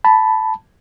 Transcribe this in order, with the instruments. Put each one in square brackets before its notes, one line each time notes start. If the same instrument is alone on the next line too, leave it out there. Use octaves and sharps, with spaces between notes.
[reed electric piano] A5 B5